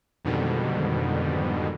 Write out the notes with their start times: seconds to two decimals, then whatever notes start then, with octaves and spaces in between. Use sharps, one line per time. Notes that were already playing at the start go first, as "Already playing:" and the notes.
0.25 F2 G#2 B2 D3 D#3 G3